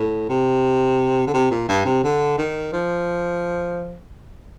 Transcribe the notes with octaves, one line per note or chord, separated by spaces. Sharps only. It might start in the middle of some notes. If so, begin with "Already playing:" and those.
Already playing: A2
C3
D3
C3
A#2
G2
C3
D3
D#3
F3